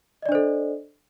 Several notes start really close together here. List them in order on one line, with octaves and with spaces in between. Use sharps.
D#5 D5 D4 C5 A4